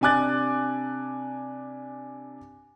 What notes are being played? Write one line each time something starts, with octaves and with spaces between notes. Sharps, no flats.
C3 D4 G#5 D6 F#6 A6